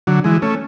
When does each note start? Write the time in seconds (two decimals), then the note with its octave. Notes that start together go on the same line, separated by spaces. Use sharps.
0.07 D3 F#3
0.24 E3 G#3
0.42 A3 C#4